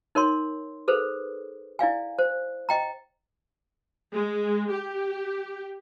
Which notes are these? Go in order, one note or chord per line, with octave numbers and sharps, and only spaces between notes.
D#4 A#4 C#5 C6
G#4 A4 B4 C5
E4 D5 F5 G#5
C5
D#5 G5 A#5
G#3
G4